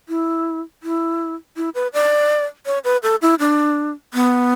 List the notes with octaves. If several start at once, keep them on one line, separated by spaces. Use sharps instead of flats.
E4
E4
E4
B4
D5
C#5
B4
A4
E4
D4
B3